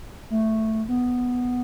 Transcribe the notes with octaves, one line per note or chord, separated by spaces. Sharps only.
A3
B3